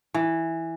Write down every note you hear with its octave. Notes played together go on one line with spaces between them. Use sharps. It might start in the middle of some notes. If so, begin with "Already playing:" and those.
E3